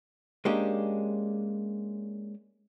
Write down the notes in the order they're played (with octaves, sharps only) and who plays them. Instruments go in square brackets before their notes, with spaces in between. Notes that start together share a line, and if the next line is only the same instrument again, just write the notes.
[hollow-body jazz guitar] G#3 A#3 C#4 D4 G4